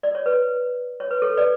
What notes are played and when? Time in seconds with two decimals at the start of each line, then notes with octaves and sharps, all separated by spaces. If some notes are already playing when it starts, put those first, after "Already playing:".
0.03 D5
0.15 C#5
0.26 B4
1.00 C#5
1.11 B4
1.22 A4 C#5
1.37 B4 D5